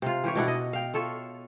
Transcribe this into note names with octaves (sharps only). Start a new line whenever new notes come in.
C3 F4
E3 G4 C#5
B2 D4 E4 F#5
D#5
F5 G5
F4 A4 C#5 E5